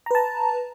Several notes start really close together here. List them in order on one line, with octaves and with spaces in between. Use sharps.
A#5 B4 A5